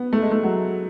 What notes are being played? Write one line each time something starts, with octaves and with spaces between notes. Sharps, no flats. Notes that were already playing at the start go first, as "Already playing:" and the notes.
Already playing: B3
A3
G#3
A3
F#3